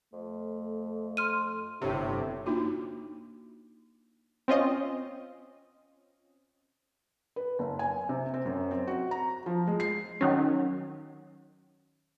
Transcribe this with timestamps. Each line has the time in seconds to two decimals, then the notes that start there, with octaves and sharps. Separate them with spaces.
0.13 F2 A3
1.17 C6 F6 D#7
1.81 G1 A2 C3 D4
2.46 A#3 D4 D#4 F4 F#4
4.48 C4 C#4 F4 D#5
7.36 B4
7.59 F#1
7.79 G#5
8.09 C3
8.34 C4
8.46 F#2
8.71 C4
8.87 F#4
9.11 A#5
9.46 F3
9.67 G#3
9.80 C7
10.21 D#3 F#3 C#4